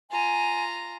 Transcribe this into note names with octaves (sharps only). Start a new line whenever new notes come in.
F4 G#5 A#5